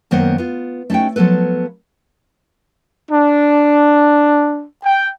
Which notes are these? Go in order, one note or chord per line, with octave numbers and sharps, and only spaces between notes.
F#2 D#3 A#3 B3 C5 F#5
B3 F4
A3 C#4 D#4 F#4 G5
F3 F#3 B3 A4 B4
D4
G5